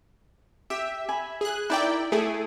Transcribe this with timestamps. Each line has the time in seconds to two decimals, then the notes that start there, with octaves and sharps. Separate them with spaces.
0.70 G4 E5
1.09 G#5 B5
1.41 G#4 F#6
1.70 D#4 E4 A#4 D5 G5
2.12 A3 E4 G#4 A4